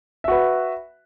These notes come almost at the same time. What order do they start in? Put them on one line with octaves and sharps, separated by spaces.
E5 F#4 B4